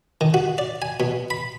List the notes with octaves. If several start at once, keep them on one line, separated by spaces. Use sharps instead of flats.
D#3
F#4
D5
G#5
B2
B5